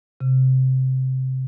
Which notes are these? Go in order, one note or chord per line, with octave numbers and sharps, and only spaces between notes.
C3